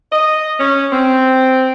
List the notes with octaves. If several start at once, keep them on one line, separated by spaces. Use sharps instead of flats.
D#5
C#4
C4